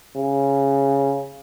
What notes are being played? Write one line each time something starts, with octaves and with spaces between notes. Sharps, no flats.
C#3